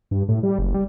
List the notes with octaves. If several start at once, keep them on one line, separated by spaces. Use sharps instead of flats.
G2
A2
G3
F#1
G3